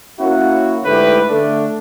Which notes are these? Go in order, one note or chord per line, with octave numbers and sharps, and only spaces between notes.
A#3 C#4 E4 F#4
G#2 D3 A3 E4 G4 B4
D3 A3 D4